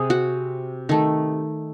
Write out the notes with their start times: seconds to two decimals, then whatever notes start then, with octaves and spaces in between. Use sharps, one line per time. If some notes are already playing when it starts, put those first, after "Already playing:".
Already playing: C3 G#4
0.10 F#4
0.89 D#3 A3